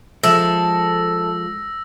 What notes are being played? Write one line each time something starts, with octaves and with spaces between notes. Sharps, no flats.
F3 G#3 A4 E5 E6 A#6